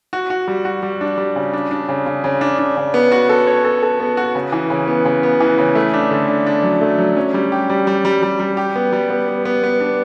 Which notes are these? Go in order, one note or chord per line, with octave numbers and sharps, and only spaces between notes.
F#4
F#4
G3
F#4
G3
D4
G3
C#3
D4
D4
C#3
C#3
C#3
D4
D4
C#3
B3
F#4
A4
C#5
A4
A4
B3
F#4
C#3
E3
C#3
B3
C#3
B3
E3
C#3
A3
D4
D3
D4
D4
F#3
A3
F#3
C#4
G3
G4
G3
G3
G3
G3
G3
G4
B3
G3
B3
B3
B3
B3
D4